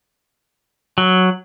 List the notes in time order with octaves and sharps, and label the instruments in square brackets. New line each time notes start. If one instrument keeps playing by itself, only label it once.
[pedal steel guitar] F#3